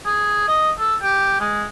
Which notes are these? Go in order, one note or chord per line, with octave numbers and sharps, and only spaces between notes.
G#4
D#5
A4
G4
G#3